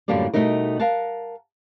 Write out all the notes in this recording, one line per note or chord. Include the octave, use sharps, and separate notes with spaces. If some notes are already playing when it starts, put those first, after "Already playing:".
F#2 A2 D3 G3 A#3 D4
B2 F#3 G3 A3 D#4 A#4
A#4 F5 F#5 A5